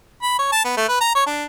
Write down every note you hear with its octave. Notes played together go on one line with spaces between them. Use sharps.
B5
C#5
A5
B3
A3
B4
A#5
C#5
D4